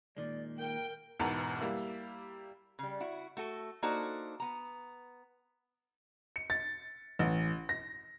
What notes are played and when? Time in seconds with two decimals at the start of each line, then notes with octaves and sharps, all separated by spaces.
0.17 A#2 D#3 G#3 D5
0.59 A#4 G5
1.19 E1 E2 G#2 B3 A#4 A5
1.61 G3 A#3 E4
2.79 C#3 G3
3.00 E4 F#4
3.37 A3 F#4 A4
3.82 A#3 D4 D#4 F#4 A4 C5
4.40 B3 A#5
6.36 C#7
6.50 A6
7.19 A1
7.69 A#6